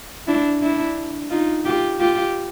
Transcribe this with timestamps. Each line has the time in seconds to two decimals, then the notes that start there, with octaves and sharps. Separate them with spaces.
0.27 D4 E4
0.61 D4 E4
1.30 D#4 F4
1.65 F4 G4
2.00 F4 G4